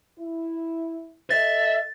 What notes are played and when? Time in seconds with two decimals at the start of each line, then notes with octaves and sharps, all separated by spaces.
0.19 E4
1.30 A4 D#5 E5 A6